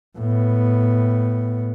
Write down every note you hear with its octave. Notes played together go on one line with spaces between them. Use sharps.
A2 B3